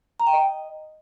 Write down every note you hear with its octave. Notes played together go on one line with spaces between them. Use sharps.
A#5
G5
D#5